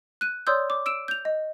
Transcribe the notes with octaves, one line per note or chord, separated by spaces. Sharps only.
F#6 D#7
C#5 D5 C6 D#6 E6 G6
D6
E6 D7 E7
G6 F7
D#5